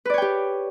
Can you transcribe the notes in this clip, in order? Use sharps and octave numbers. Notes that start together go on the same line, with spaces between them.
G4 B4 C#5 D5 G5